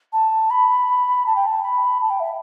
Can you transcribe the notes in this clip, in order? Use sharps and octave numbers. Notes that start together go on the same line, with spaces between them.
A5
B5
A5
G5
A5
B5
A5
G5
E5